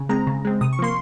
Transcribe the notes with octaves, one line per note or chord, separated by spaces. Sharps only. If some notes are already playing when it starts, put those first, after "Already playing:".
Already playing: C#3
G#3 C4 A#5
C#3
G#3 C4
C3 D#6
C#6
F3 A#3 C6